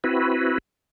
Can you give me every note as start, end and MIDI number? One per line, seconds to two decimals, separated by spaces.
0.04 0.58 60
0.04 0.58 64
0.04 0.58 66
0.04 0.58 71